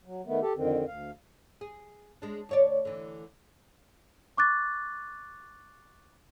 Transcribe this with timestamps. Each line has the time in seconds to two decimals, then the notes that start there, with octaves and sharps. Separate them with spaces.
0.05 F#3
0.26 D#3 A3 B3
0.41 G4 A4
0.56 F2 D3 D#3 C4
0.87 D2 F5
1.61 G#4
2.22 G#3 D4
2.49 D2 C#5 D5
2.85 D3 E3
4.37 C#6 D6 F#6 A6